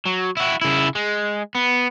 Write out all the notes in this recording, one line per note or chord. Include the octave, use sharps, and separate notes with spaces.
F#3
E4 F#4
C#3 E4
G#3
B3